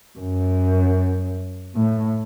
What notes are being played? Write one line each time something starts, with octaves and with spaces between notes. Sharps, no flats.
F#2
A2